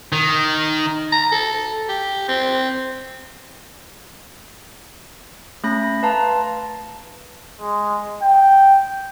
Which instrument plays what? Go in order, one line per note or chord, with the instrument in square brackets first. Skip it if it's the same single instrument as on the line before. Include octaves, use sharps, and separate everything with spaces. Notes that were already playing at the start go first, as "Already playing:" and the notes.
[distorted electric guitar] D#3
[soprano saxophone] A#5
A4
G4
C4
[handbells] A3 C#4 B5 A#6
B4 F5 A5 A#5 C6
[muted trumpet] G#3
G5